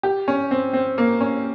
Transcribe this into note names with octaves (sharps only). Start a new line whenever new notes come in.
G4
C#4
C4
C4
A#3
C#4